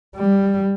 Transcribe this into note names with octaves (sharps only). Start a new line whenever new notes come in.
G3